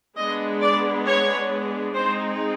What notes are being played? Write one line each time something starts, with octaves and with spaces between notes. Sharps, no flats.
G#3 B3 D4 D#5
D5
C#5
G#3 C4 D#4 C5